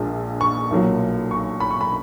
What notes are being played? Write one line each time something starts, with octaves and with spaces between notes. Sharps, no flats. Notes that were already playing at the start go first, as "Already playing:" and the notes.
Already playing: A#1 A#2 G#3
C#6
B1 A#2 F#3
C#6
B5
C#6
B5